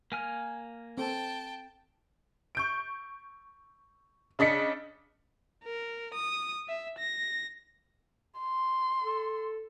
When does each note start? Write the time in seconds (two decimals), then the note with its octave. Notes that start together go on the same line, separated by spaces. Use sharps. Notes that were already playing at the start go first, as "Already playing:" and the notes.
0.12 A#3 G#5 F6
0.98 C4 A4 G5 A5
2.55 C#6 G6 D7
4.39 C#3 D4 D#5 B6 C#7
5.65 A#4
6.14 D#6
6.68 E5
6.99 A#6
8.40 C6
9.04 A4